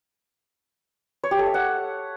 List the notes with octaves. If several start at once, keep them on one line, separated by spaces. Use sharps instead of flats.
C#5
G4
A4
E5
F#5